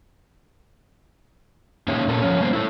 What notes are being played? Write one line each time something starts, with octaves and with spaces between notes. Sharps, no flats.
A#3 C#4 D#4 G4 C#5 E5
A#2 A#3 C#4 A4
F3 C#4
G3 A#3 B3 C5
E4 A4